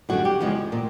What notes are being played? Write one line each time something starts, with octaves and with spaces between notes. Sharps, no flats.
F#2 D3 G3 F#4
G4
E2 C#3 F3 G#3
A#2